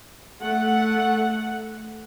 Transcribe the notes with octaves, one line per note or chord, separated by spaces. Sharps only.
A3 F#5